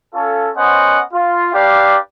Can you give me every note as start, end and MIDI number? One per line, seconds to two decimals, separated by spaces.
0.14 0.50 61
0.14 0.50 65
0.14 0.50 69
0.56 1.00 59
0.56 1.00 61
0.56 1.00 72
0.56 1.00 75
0.56 1.00 78
1.13 1.52 65
1.54 1.97 62
1.54 1.97 67
1.54 1.97 71
1.54 1.97 74
1.54 1.97 77